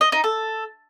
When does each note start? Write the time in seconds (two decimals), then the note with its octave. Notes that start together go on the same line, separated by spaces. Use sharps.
0.01 D#5
0.12 D#4
0.24 A4